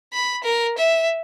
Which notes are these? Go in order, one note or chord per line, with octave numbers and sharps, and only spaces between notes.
B5
A#4
E5